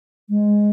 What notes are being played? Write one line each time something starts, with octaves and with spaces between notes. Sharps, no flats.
G#3